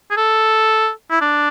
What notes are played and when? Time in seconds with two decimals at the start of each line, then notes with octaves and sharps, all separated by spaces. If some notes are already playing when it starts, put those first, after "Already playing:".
0.11 G#4
0.17 A4
1.11 E4
1.21 D4